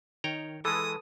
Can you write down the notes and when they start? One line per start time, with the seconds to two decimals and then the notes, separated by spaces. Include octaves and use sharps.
0.24 D#3 C#5 G5 A#5
0.65 E3 G#3 A4 B4 D#6